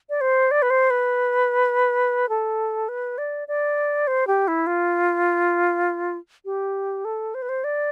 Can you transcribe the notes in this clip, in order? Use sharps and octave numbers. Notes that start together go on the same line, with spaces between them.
D5
C5
D5
B4
C5
B4
A4
B4
D5
D5
C5
G4
E4
F4
G4
A4
C5
B4
C5
D5